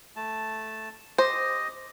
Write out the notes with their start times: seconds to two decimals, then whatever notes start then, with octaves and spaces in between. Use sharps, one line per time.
0.16 A3 A5
1.18 G4 C5 D#5 D#6